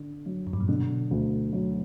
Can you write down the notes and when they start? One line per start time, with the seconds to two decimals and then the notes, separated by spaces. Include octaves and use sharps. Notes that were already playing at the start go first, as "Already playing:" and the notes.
Already playing: D3
0.26 F#3
0.47 F#2
0.53 G2
0.61 A#2
0.68 B2 D3
1.11 D2
1.53 F#3